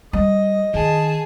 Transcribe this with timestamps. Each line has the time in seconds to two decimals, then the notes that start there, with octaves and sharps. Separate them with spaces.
0.13 G3 D#5
0.74 D#3 G#4 A5